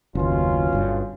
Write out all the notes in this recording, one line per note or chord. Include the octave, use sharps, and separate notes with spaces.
F#1 D#2 B2 C#4 F4
G1 G2 D3